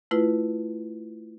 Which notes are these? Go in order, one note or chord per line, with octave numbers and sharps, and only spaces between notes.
A3 E4 F4 B4